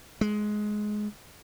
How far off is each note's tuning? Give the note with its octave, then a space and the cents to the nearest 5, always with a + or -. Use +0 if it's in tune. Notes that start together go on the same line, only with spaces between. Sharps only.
G#3 +15